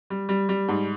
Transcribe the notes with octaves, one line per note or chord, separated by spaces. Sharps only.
G3
G3
G3
G#2